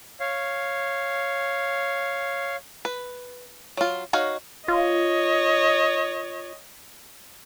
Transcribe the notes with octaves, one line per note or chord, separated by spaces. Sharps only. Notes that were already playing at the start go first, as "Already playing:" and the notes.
C#5 F5
B4
F#3 F4
D#4 F#4 C#5 F5
F4 C#5 D#5